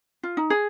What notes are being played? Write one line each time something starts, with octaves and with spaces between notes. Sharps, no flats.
F4
D#4
G#4